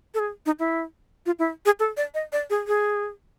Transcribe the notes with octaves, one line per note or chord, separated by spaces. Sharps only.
A4
G#4
D#4
E4
F4
E4
G#4
A4
D5
D#5
D5
G#4
G#4